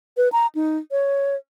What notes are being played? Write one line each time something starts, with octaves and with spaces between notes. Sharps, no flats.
B4
A#5
D#4
C#5